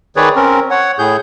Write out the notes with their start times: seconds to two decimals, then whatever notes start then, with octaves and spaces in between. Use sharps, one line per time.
0.17 D#3 G#4 B4 C#5 D5
0.36 C4 C#4 A#4
0.71 C#5 F#5
0.99 A2 G#4 G6